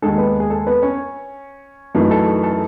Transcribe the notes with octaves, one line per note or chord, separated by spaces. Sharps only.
D#2 D#3 G#3 D#4 A4
B3 B4
G#4
A4
B3 B4
C#4 C#5
F#2 E3 A3 D#4
A4
A4